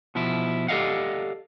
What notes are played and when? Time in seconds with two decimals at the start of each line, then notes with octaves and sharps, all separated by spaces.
0.15 B2 F3 E4
0.68 G4 A4 D5 D#5 F5 F#5